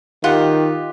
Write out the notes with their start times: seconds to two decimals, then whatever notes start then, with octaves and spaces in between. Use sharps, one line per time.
0.24 D#3 F4 G4 F#5